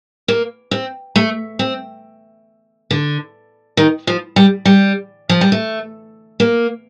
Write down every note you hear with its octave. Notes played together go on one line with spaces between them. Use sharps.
A#3
C4
A3
C4
D3
D#3
F3
G3
G3
F3
G3
A3
A#3